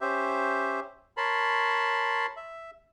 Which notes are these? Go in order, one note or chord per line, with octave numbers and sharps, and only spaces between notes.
C#4 G4 C5 E5
A#4 C#5 A5 B5 C6
E5